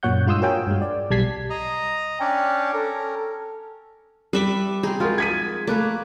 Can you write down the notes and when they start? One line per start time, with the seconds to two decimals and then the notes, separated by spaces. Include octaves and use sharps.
0.03 F#2 A#2 C#5 F#5 G6
0.26 G2 G#3 F4 C6 D#6 E6
0.42 F#4 A#4 C#5 F5 G5 G#5
0.67 G2 G#3
0.82 D5
1.11 B1 G3 A5 G#6 B6 C7
1.50 D#5 A#5
2.20 C#4 D4 G5
2.73 C#4 A4 A#4
4.33 G3 B4 E5 D6
4.83 C4 D#4 G#4
5.00 F3 G#3 F4 F#4 A#4
5.18 G#6 B6 D#7
5.67 A3 A#3 B4 D5